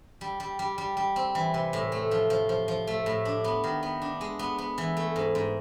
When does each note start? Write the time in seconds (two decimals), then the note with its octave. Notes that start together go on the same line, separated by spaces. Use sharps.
0.21 G3
0.40 G3
0.59 G3
0.78 G3
0.97 G3
1.16 C4
1.35 E3
1.54 C3
1.73 A2
1.92 A3
2.11 F3
2.30 F3
2.49 F3
2.68 F3
2.87 A3
3.06 A2
3.25 D4
3.44 B3
3.64 D#3
3.83 B3
4.02 D4
4.21 G#3
4.39 B3
4.58 B3
4.78 E3
4.97 A3
5.16 G#2
5.35 G#2